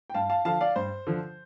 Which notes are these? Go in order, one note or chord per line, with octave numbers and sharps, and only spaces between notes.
G5
G2 F5 A5
F5 A5
D3 F3 F5 A5
D5 F5
G2 C5
D3 F3